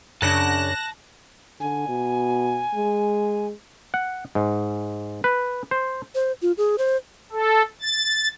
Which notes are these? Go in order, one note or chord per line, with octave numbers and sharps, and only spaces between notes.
F#2 C#3 C#4 D4 A5 F#6 A#6
D3 G#5
B2
G#3
F#5
G#2
B4
C5
C5
F4
G#4
C5
A4
A6